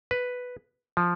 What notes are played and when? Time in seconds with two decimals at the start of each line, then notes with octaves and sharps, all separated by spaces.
0.11 B4
0.97 F3